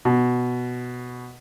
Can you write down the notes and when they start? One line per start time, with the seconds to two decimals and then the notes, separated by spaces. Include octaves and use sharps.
0.05 B2